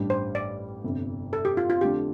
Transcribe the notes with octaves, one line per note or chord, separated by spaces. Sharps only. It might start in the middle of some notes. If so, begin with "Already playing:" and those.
Already playing: A1 G2 G3 D4
C5
D5
G1 F2 C3
A4
G4
F4
F4
F2 D3 A3 D4 F4 G4